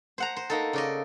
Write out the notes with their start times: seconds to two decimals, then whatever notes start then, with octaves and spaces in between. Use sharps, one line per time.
0.18 C5 F#5 A#5
0.36 C5
0.50 A#3 D#4 A4
0.73 C#3 D5 D#5